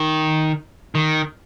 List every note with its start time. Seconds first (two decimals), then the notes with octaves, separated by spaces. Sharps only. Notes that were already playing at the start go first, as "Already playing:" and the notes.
Already playing: D#3
0.95 D#3